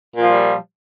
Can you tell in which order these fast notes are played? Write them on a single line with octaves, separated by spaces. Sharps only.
A#2 F3 G3